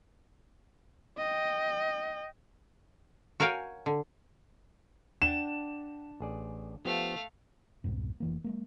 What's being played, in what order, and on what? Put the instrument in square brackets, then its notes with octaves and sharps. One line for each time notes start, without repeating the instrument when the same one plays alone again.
[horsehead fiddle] D#5 G5
[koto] F#4 A#4 C#5 F5 G5 G#5
D3
[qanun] D4 [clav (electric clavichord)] F#5 G5 [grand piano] E7
[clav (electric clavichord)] A1 G#4 D5
[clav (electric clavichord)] F3 B3 G4 [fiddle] A3 F5
[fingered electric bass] C2 F2 G#2 B2
F1 E3 A#3
F#3 G#3 A#3